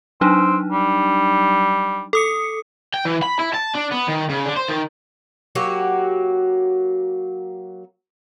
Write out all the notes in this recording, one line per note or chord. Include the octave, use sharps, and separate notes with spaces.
F#3 C4 D4 D#4
G3
A4 D#6 C#7
G5
E3
B5
E4
A5
D4
B3
D#3
C#3
D3
C5
D#3
F#3 A#3 F#4 G4